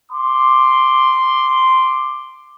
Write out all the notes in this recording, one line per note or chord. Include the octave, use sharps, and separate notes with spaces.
C6 D6